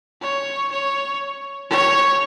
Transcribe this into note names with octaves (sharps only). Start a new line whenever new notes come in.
C#5
C#5
C#5